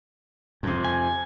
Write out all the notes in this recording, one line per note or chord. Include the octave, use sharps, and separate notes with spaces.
F2 C3
G#5